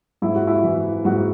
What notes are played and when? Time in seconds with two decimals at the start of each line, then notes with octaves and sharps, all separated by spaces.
0.22 G#2 E4
0.35 F#4
0.47 E4
0.63 E3
1.05 G#2 F#4